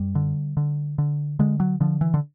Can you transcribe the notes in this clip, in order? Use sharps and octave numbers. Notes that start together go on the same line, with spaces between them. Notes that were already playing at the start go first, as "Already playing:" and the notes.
Already playing: F#2 G3
D3
D3
D3
D3 G#3
F#3
D3 F3
E3
D3